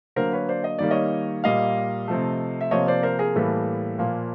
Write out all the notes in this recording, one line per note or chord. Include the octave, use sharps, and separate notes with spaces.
D3 F#3 A#3 A#4 C5
B4 C#5
C5 D5
D#5
D#3 G3 A#3 D5
C#5 D#5
A#2 G3 A#3 D#5 F5
C3 F3 A3
E5
C3 F3 A#3 C#5 D#5
C5 D5
A#4 C5
G#4 A#4
A2 E3 G3 A#3 A4 B4
A#2 F3 A#3